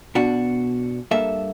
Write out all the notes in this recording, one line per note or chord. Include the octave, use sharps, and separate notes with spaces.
B2 D4 F#4
G2 A#3 A4 E5